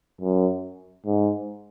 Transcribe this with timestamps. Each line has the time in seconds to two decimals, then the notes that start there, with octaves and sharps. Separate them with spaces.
0.22 F#2
1.06 G#2